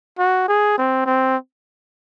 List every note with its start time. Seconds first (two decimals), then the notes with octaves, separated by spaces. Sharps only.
0.19 F#4
0.48 G#4
0.78 C4
1.06 C4